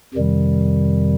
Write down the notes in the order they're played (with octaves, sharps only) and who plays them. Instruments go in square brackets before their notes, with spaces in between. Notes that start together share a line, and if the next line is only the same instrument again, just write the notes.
[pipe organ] F2 C3 D#3 G3